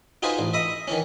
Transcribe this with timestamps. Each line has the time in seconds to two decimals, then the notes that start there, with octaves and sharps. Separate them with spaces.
0.22 D#4 F4 F#4 G#4 B4 C5
0.39 A1
0.54 D#5 E5 B5 D#6
0.88 D#3 E3 C#4